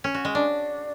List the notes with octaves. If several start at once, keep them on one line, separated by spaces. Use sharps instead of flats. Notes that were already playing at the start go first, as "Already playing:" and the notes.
C#4
F#4
G#3
D4